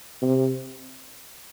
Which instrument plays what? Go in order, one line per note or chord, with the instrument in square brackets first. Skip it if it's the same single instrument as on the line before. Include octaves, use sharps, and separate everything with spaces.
[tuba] C3